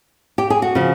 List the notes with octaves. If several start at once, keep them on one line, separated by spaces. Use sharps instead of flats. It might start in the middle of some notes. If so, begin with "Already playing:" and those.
G4
G#4
F#4
C#3 F3